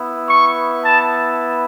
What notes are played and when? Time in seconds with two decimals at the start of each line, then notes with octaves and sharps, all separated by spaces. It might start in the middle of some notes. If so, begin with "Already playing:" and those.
Already playing: B3 E4
0.29 C#6
0.83 A5